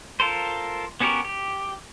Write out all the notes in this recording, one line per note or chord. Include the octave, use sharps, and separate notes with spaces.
F4 A4 A#4 C5
B3 C#4 F#4 G4 A#4
G4